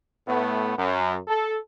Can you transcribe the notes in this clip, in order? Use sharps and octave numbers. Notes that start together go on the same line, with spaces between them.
A2 A3 B3
F#2
A4